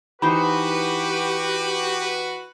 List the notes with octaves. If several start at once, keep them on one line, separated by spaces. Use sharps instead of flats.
E3 D#4 F#4 G4 B4 C5 B5